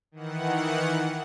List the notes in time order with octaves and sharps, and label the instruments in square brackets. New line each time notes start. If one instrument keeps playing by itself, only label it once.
[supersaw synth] D#3 E3 F#5